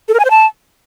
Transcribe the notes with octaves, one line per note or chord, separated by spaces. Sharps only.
A4
A#4
G#5
C5
A5